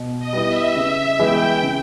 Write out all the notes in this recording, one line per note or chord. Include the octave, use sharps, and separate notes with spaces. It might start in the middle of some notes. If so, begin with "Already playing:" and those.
Already playing: B2
D#5
G3 B3 E4
E5
C#3 E5
E3 G#3 B3 E4 G5
C#3